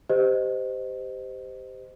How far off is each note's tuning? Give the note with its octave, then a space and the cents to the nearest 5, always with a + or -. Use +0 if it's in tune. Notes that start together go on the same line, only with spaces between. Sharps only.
G4 +0 C5 -20 D#5 +0